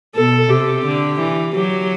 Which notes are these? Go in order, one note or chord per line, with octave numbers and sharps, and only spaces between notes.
B2 A4
C3 G4
D3
E3
F#3 G4